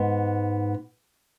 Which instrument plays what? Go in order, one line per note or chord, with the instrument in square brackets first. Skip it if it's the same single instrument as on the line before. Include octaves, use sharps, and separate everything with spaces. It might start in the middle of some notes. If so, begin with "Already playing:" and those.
Already playing: [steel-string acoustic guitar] G#2 B3